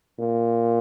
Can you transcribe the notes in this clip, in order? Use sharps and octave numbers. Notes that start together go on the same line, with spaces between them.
A#2